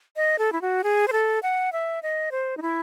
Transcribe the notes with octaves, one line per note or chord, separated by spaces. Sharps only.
D#5
A4
E4
F#4
G#4
C5
A4
F#5
E5
D#5
C5
D#4
E4